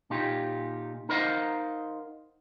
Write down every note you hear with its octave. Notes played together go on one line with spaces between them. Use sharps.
A#2 D#4 F4 G4
D#4 A#4 C5 D#5 F5 F#5